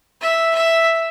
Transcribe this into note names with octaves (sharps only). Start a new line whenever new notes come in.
E5
E5